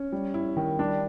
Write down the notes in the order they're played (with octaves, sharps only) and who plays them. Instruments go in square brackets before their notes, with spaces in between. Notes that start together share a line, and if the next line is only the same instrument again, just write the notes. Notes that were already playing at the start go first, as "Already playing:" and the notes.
Already playing: [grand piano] C#4
[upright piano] G3
E4
D#3
[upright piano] G3 [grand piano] D4